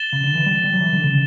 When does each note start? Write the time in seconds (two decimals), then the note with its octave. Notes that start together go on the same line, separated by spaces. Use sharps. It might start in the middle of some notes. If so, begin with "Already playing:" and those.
Already playing: A6 E7 G7
0.13 C#3
0.24 D3
0.35 E3
0.46 G3
0.64 G3
0.73 F#3
0.81 E3
0.93 D3
1.04 C#3